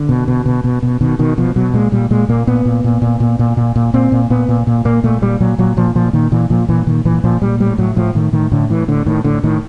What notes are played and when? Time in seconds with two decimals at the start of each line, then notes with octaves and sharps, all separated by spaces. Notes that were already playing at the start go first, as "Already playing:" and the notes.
Already playing: D3
0.09 B2
0.28 B2
0.46 B2
0.64 B2
0.83 B2
1.01 B2 D#3
1.19 B2 D#3
1.38 B2 F3
1.56 B2 F#3
1.74 A#2 G#3
1.92 A#2 G3
2.11 A#2 G#3
2.29 A#2 A#3
2.47 A#2 B3
2.65 A#2
2.84 A#2
3.02 A#2
3.20 A#2
3.39 A#2
3.57 A#2
3.76 A#2
3.94 A#2 C4
4.12 A#2
4.30 A#2 B3
4.49 A#2
4.67 A#2
4.85 A#2 A#3
5.04 A#2 A3
5.22 A#2 G3
5.40 A#2 F#3
5.58 A#2 F#3
5.77 A#2 F3
5.95 A#2 F3
6.13 A#2 D#3
6.32 A#2 E3
6.50 A#2 F3
6.69 A#2 E3
6.87 A#2 D#3
7.05 A#2 E3
7.24 A#2 F3
7.42 A#2 G3
7.60 A2 G3
7.78 A2 F#3
7.96 A2 F3
8.15 A2 D#3
8.33 A2 D#3
8.51 A2 D3
8.70 A2 E3
8.88 A2 D3
9.06 A2 D#3
9.24 A2 D3
9.43 A2 D#3